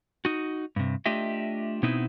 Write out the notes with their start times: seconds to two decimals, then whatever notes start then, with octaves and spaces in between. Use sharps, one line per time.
0.25 D#4 F#4
0.76 G2 C3
1.06 A3 D4 F4 G4 D#5 E5
1.83 B2 B3 C4 D#4 E4